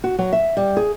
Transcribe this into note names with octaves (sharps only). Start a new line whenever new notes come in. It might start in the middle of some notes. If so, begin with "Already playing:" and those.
F#4
F#3
E5
G3
G#4